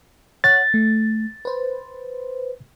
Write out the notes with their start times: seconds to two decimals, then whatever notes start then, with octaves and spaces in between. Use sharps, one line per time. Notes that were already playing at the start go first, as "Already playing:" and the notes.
0.44 C#5 F#5 F#6 A6
0.74 A3
1.45 B4 C5